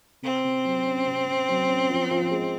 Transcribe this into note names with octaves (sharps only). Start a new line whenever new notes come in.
C3 C4
C3
F#3
C#4
C3
C3
F#3
C#4
F3
F3
G#3